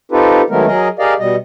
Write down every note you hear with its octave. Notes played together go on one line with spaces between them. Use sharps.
C4 D#4 F4 G4 A4 B4
D#3 F#3 G#3 A3 B3 A#4
F#3 G#4 A#4 D#5
G4 G#4 A#4 D5 D#5 F5
B2 G3 D#5